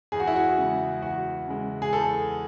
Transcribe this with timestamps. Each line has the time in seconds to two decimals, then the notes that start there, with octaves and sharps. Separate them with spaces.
0.12 E2 G#4
0.20 F#4
0.27 E4
0.36 F#4
0.58 C#3 G#3
1.02 E2 F#4
1.48 C#3 G#3
1.82 G#4
1.92 E2 A4